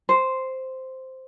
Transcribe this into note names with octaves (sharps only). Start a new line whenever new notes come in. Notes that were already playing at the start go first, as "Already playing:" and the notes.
C5